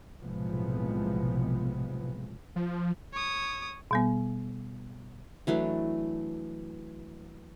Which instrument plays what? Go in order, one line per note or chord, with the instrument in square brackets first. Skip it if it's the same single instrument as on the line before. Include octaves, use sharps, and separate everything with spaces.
[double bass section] B1 A2 C3 F3 G#3 B3
[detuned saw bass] F3
[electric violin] C#5 D#6
[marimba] B2 G3 B3
[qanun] E3 F#3 A3 D4